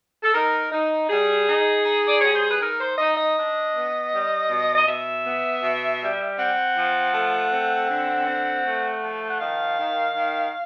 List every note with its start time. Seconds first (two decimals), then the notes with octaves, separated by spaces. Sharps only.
0.23 A4
0.34 D#4 A#4
0.72 D#4
1.10 G3 G#4
1.48 D#4
1.86 D#4
2.05 D5
2.19 G3 C#5
2.33 C5
2.47 B4
2.60 D#4 A#4
2.80 C5
2.98 D#4 D#5
3.17 D#5
3.36 D4
3.74 B3
4.12 G3
4.50 B2
4.75 D#5
4.87 B2 E5
5.25 B3
5.63 B2
6.01 G3
6.38 C4 F#5
6.76 F3
7.14 A3
7.52 C4
7.89 D3
8.27 C4
8.65 A3
9.02 F3
9.30 F#5
9.39 D#3 F5
9.78 D#3
10.15 D#3